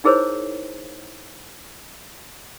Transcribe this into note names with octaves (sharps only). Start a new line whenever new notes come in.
D#4 E4 G#4 A#4 C5 C#5